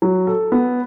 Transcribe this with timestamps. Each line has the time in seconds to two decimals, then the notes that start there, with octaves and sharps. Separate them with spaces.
0.02 F#3
0.27 A4
0.52 B3